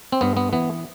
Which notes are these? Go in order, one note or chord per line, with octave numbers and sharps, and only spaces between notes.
C4
G2 B3
B3
E3 B3